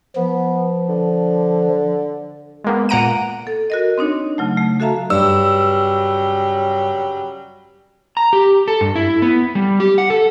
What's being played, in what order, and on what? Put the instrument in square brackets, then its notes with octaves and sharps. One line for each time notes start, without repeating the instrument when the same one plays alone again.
[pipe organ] F3 [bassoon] B3
[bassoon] D3
[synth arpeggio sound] G#3 A#3 B3
A#2 A#3 F#5 A#5 D7 D#7
[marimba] A4
F#4 A#4 D#5
C4 D4 D#4 C#5
C#3 F#3 A3
A3
F#4 A4 E5 F5 A5 A#5
[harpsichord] G2 [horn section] C#3 F#3 G3 [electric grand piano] E6
[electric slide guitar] A#5
G4
A4
G2
E4
B3
G3
G4
F#5
A4